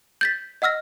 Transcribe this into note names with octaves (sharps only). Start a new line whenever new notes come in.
G6 A6 B6
D#5 F#5 E6 F6 A#6